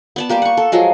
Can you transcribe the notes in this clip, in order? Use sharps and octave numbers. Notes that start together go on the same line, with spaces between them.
B3 D5 A5
G3 A#3 G4 D5
F#5 C#6
A4
F3 F#3 G#3 F4